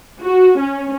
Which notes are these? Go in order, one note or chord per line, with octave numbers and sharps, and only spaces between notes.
F#4
C#4